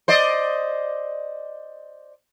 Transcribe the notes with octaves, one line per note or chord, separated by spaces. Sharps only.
C5 D5 D#5